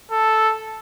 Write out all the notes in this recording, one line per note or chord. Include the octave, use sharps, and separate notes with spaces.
A4